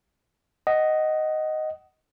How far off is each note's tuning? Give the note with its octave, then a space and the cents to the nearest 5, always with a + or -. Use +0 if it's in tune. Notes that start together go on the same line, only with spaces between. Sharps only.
D#5 +0 F#5 +20